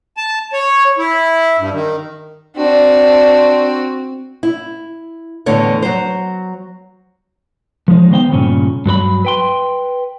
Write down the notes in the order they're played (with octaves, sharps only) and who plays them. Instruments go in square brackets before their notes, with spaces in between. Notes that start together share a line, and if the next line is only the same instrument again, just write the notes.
[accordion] A5
C#5
E4
G2
D#3
[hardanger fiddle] C4 F#4 [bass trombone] D4
[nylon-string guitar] E4
E2 A2 D3 C#5
F#3 C5
[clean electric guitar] F3 G#3 D#4
D#3 B3 C5 F#5 G5
G2 A#2 C#3 C#4
G2 F#3 B4 B5
B4 G5 C6